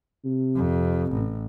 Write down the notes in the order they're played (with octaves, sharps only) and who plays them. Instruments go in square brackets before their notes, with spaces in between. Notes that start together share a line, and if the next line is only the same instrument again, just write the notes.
[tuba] C3
[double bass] F2
A1